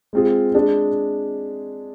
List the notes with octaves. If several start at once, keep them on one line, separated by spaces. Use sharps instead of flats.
G#3 C4 F4 G#4
G#3 D4 G#4